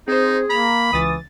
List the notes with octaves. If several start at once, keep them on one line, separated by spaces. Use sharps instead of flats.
C4 D#4 G#4 C5
A#3 A#5 B5
C#2 E3 D#6 A6